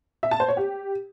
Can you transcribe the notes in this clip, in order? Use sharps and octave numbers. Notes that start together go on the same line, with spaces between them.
E5
A5
C5
C#5
G4